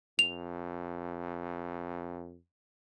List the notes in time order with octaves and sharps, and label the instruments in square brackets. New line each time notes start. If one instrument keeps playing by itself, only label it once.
[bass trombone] F2 [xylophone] F7